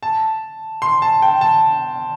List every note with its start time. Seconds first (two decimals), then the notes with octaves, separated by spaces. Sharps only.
0.03 A5
0.82 C6
1.02 A5
1.22 G5
1.41 A5